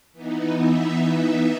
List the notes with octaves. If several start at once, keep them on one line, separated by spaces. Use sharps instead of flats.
E3 B3 D#4
E5